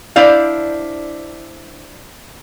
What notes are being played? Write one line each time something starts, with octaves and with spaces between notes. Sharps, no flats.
D4 E4 C5 D5 F5